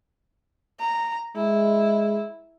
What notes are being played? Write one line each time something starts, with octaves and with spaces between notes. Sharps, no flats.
A#5
G#3 E4